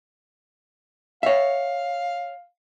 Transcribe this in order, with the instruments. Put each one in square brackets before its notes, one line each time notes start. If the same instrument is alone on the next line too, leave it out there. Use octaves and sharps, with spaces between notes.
[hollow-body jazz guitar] C#5 E5 [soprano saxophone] F5